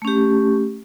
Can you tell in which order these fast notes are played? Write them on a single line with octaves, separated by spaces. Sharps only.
A3 C#4 G4